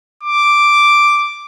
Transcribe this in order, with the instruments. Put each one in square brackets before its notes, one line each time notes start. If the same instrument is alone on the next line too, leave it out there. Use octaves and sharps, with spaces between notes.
[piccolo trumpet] D6